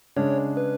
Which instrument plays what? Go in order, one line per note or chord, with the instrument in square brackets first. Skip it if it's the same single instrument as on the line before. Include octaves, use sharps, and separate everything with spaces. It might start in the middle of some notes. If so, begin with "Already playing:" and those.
[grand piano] C#3 G#3 D4 [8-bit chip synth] C#5
[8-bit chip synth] B4